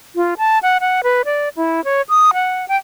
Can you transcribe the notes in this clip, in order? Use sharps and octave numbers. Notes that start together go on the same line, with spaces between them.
F4
A5
F#5
F#5
B4
D5
E4
C#5
D#6
F#5
G5